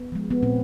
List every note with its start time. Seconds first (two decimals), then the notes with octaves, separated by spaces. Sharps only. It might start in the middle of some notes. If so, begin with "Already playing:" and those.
Already playing: B3
0.12 F3 G#3
0.31 B3
0.42 A#2 C4